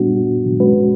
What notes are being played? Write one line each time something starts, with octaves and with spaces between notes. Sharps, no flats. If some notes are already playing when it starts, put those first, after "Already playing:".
Already playing: A#2 G3 B3 D4 F#4
G#3 C#4 F#4 B4